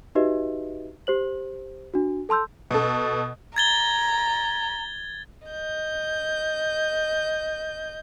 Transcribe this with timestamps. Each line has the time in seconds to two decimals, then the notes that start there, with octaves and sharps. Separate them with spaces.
0.15 D#4 F#4 G4 B4 D#5 E5
1.07 G4 C5 F#7
1.94 D4 F#4
2.29 A4 A5 C6 E6 G6
2.71 B2 A4
3.56 A#5 G#6 A6 G7
5.48 D#5 G6